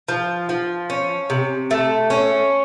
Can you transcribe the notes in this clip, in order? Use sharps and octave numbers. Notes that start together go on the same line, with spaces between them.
F3
F3
C#4
C3
A3
C#4